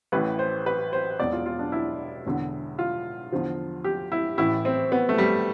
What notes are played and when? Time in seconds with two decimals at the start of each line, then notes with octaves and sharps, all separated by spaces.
0.12 A1 A2 E3 B4
0.39 C5
0.66 B4
0.93 C5
1.19 E1 E2 B2 D5
1.33 F4
1.46 F4
1.59 D4
1.72 E4
2.26 E1 E2 D3
2.79 F4
3.32 E2 D3 F3
3.84 G4
4.12 E4
4.38 A1 A2 E3 E4
4.65 C4
4.92 B3
5.09 A3
5.18 G3